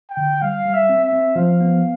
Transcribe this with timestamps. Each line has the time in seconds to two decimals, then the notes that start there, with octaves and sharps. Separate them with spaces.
0.10 G5
0.17 D3
0.42 G3 F5
0.65 G3
0.74 E5
0.89 C4
1.04 E5
1.13 C4
1.36 F3 F5
1.60 B3